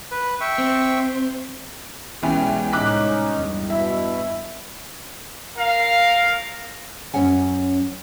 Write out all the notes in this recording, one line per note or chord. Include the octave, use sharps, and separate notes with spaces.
B4
E5 G5 C#6
C4
B1 E2 E3 G#3 B3 C#4 G4 G5
C2 A2 G#3 C#4 D#4 D6 F#6 B6
E2 G2
B2 E4 E5
A#4 F5
F#2 G3 C#4 C#5 F#5 G#5